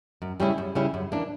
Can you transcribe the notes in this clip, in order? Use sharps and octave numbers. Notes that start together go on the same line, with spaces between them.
F#2
C#3 G3 C#4 E4
F#2
C#3 G3 C#4 E4
F#2
E3 A#3 D4